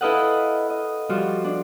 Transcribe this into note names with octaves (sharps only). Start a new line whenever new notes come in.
E4 A4 B4 D#5 F5 F#5
D#5
F3 G3 F4 F#4
D4